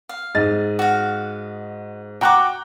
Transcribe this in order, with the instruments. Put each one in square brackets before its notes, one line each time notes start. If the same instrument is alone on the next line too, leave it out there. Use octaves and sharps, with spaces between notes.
[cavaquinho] F5
[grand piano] G#2 D#5 A6
[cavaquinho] F#4 F5
[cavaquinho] F#4 C#6 D6 [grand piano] G5 A#5 F#6